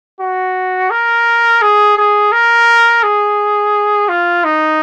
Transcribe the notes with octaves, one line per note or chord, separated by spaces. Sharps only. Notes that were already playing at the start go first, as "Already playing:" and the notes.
F#4
A#4
G#4
G#4
A#4
G#4
F4
D#4